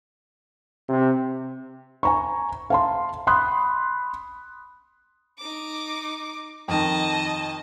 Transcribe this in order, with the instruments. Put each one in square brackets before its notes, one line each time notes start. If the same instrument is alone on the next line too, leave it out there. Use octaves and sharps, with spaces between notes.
[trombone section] C3
[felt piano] G#5 A#5 C#6
F5 A5 C6
B5 C6 D#6 F#6
[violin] D#4 D6
[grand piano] F2 D#3 [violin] D#5 A5